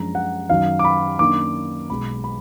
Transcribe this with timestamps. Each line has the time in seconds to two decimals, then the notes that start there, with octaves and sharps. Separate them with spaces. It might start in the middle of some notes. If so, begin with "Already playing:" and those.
Already playing: F#2 F3 G#3 D4 A#5
0.15 F#5
0.49 F#2 D#3 F#3 F5
0.79 D6
0.85 B5
1.19 F#2 D#3 A#3 D4 D6
1.89 B1 B2 G#3 B3 B5
2.24 B5